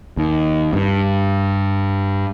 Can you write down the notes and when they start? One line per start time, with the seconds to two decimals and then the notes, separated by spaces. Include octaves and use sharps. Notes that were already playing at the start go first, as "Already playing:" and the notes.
0.17 D#2
0.73 G2